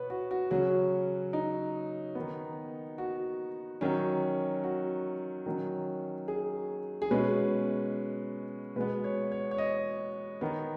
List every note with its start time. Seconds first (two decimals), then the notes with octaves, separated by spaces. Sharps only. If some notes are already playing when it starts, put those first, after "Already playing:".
Already playing: B2 B3 B4 C#5
0.10 F#4
0.31 F#4
0.51 C#3 F#3 C#4 F#4
1.33 D#4
2.15 D#3 B3
2.98 F#4
3.81 D#3 F#3 C#4
4.64 F#4
5.46 D#3 F#3 C#4
6.28 G#4
7.02 G#4
7.11 B2 G#3 C#4 B4
8.76 B2 G#3 B3 B4
9.04 C#5
9.32 C#5
9.51 C#5
9.58 D#5
10.41 D#3 B3